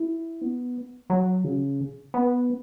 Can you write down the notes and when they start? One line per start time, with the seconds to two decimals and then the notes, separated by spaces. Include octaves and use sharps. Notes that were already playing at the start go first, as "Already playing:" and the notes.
Already playing: E4
0.41 B3
1.10 F#3
1.44 C#3
2.14 B3